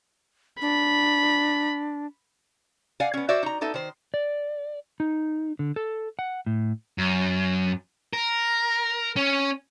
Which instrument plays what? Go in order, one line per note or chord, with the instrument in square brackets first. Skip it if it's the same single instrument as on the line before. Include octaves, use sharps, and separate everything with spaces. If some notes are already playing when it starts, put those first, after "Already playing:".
[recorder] D4 [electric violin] B5
[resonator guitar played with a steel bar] D5 F5 F#5 G#5
B3 C#4
F#4 C5 D5 E5
D#4 A#5
B3 D#4 A4 E5
D#3 C5
[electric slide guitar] D5
D#4
D3
A4
F#5
A2
[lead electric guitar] F#2
A#4
C#4